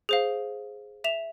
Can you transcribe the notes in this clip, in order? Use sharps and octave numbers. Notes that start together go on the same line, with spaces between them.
G#4 C5 F5
E5 E7 F7